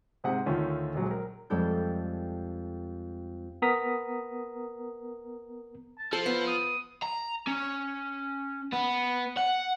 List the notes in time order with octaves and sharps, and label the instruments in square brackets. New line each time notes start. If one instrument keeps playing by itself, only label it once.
[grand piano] G#2 C3 G#3 G#4 F#5
D2 D#3 C#4 F4 A4
A#1 F#3 G#3
A#4
[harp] F2 G3 G#3 A4 G6
[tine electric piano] B3 A#4 A#5 D#6 B6
[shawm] A5
[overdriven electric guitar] F3 [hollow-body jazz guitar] A4 [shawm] C5
[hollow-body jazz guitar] B3
[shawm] D#6
[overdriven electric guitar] A#5
C#4
B3
F#5